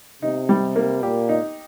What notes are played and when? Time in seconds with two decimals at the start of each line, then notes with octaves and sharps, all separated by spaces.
0.22 C3 D#4
0.49 G3
0.76 A#3
1.02 A#2 G4
1.29 D#4